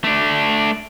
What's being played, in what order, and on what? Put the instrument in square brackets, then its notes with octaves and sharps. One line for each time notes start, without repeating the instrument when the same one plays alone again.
[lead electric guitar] A3 D4